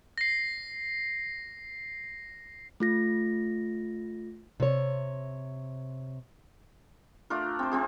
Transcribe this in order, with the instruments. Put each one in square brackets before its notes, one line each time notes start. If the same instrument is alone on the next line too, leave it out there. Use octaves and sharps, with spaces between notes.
[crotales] A#6 C7
[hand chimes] A3 F4 A#6
[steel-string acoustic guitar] C3 C#5
[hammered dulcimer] A3 D4 F4 A#4
C4 C5
C4 F4 G#4